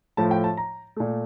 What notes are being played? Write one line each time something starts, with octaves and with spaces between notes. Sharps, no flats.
A2 F3 A3 A5
G5
A5
A#5
A#2 A3